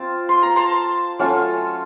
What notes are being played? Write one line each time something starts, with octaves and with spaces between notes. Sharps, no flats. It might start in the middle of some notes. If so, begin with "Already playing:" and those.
Already playing: C4 F4 A5
C6
A#5
A5 C6
F#3 A3 C#4 F4